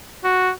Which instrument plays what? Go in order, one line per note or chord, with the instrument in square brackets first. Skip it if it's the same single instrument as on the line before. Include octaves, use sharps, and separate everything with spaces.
[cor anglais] F#4